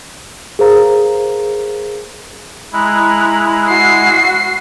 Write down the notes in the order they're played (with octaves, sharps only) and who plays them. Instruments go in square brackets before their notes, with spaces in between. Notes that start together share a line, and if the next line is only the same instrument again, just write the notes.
[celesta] G#4 A#4 C5 F5 A#5
[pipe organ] G#3 E4 [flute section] A#5 B5 F#6
[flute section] F#4 F#5 [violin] C7